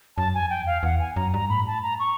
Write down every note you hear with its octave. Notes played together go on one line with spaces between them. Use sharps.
F#2 A5
F2 G#5
G5
E2
F5
E2 F#5
G#5
F#2 A#5
G2 A#5
A2 B5
A5
A#5
C#6